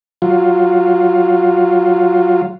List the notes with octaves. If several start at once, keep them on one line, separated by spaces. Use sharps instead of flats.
F#3 F4